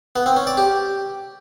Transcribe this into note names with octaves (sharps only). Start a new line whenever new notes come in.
B3
C4
C#4
D5
G4